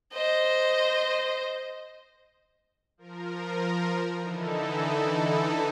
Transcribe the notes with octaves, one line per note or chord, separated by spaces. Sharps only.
C5 D#5
F3 A#4
D3 E3 D#4 E4 A4